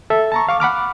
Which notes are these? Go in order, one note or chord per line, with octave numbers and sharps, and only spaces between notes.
A4 E5
A5 A#5 C#6
F5 C#6 D6
F#5 B5 D6 F6